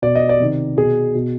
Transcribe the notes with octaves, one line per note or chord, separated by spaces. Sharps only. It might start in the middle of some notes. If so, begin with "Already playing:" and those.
B2 D5
D#5
D5
C3 D#3
B2 G#4
B2